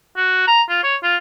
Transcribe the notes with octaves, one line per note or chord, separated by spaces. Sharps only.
F#4
A#5
F4
C#5
F4